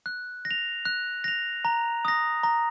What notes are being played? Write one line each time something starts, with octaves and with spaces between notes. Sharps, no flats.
F#6
A#6
F7
F#6
A#6 F7
A#5
D#6 A#6
A#5